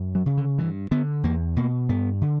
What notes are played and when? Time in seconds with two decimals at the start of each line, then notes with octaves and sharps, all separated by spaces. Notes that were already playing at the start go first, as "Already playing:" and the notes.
Already playing: F#2
0.15 F#3
0.26 C#3
0.37 D3
0.58 G2 E3
0.91 D3 B3
1.23 E2 A#3
1.56 B2 A#3
1.89 G2 B3
2.21 D3